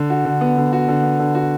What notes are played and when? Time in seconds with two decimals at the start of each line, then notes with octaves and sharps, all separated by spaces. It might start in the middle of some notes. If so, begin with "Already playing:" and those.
Already playing: D3
0.10 F#4
0.25 D3
0.41 B3
0.57 D3
0.73 F#4
0.88 D3
1.03 B3
1.19 D3
1.35 F#4